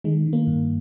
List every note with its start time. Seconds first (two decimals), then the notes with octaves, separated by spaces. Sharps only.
0.04 D#3 G#3
0.26 D#3
0.33 A#3
0.47 G2